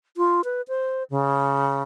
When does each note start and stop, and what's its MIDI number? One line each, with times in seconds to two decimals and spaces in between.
0.17 0.41 65
0.44 0.62 71
0.68 1.03 72
1.10 1.83 49